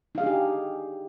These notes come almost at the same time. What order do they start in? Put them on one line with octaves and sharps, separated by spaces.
D#4 F5 G#4 D4 G4